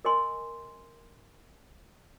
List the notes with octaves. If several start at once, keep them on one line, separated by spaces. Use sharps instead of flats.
A#4 D#5 G#5 C6